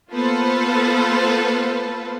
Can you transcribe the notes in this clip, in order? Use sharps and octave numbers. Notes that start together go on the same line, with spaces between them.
A#3 B3 F4 A4 B4 C5